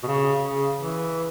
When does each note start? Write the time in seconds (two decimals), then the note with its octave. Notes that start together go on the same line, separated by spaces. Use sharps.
0.03 B2
0.07 C#3
0.43 C#3
0.79 E3